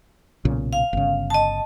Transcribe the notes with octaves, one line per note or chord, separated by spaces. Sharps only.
B1 A#2 C#3
F5
G1 C#3
D#5 A5